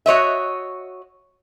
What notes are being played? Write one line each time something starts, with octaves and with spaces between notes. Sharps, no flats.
F#4 C#5 D#5 E5